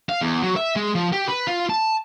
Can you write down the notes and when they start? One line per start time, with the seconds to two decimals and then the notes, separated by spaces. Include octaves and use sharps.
0.09 F5
0.21 E2
0.42 F#3
0.56 E5
0.76 G#3
0.95 F3
1.12 G4
1.28 B4
1.47 F4
1.70 A5